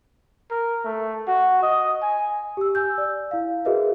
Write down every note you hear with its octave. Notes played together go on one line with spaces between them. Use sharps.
A#4
A3
F#4
D#5
G#5
G4 E6
G#5 E6 G6
D5
E4 F5
F#4 G#4 A#4 B4 D#5 E5